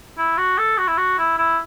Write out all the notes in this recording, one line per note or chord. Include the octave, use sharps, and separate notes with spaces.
E4
F#4
A4
F#4
E4
F#4
E4
E4